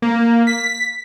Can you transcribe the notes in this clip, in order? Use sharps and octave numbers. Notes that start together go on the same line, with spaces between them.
A#3
B6